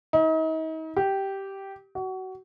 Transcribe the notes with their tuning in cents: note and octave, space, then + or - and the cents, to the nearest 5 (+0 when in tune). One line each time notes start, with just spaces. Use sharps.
D#4 +40
G4 -10
F#4 +25